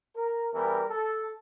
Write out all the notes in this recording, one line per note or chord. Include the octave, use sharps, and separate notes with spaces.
A#4
E2 E3 G3 A#4
A4